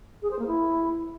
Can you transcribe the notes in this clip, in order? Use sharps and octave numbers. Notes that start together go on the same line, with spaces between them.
G#4
C5
A#3
E4